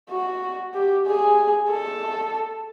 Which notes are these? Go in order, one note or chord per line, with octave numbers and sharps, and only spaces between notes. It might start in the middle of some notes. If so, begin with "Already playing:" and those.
F#4
G4
G#4
A4